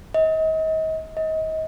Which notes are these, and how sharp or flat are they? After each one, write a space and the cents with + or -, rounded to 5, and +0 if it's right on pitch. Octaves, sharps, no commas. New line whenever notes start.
D#5 +35
D#5 +30